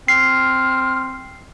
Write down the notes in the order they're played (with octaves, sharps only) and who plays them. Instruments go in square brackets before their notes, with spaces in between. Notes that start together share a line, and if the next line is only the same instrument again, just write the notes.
[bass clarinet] C4 [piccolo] F6 [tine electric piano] C7